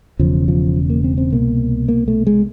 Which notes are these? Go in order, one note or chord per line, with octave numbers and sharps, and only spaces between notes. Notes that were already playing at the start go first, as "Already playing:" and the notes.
E1 E2 C#3 F3
F3
A#3
C4
C4
C2 B2 A#3
A#3
A3
G#3